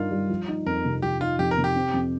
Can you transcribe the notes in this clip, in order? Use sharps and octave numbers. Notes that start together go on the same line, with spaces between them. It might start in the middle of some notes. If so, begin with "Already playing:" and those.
Already playing: G2 G3 D#4 F4 A#4
G3
F3
D#4
F2 A#4
C3
F3 G4
D#4 F4
F2 G4
A#4
C3
G4
C4
F2